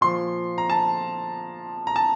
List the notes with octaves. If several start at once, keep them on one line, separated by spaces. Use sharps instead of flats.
A#2 F3 C6
A#5
A5
A#5
A5